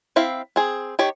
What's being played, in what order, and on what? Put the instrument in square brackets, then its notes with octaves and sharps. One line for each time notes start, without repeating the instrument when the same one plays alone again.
[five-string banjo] C4 E4 E5 F5
C4 G#4
D#3 G4 C#5